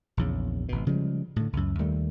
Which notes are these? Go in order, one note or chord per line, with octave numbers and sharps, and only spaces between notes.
A#1 E2 C#3
G#1 B2
C#3 F3 G3 G#3
A2 D3
C#2 F#2
D#2 D#3 G3 A3